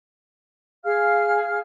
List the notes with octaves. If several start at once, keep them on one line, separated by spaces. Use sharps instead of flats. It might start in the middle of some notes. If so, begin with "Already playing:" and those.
G#4 F5 F6